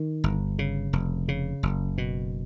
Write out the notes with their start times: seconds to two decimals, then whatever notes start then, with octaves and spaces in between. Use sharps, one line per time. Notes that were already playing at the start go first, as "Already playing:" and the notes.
Already playing: D#3
0.24 G1
0.59 C#3
0.93 F1
1.28 C#3
1.63 F#1
1.98 B2